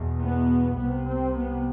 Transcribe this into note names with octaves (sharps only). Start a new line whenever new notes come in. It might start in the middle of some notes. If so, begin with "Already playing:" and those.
Already playing: E2 B2
B3
C2 C3 B3
C4
B3